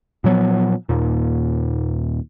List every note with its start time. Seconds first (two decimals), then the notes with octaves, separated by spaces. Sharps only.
0.24 A#2 F3 F#3 B3
0.89 D#2 A#2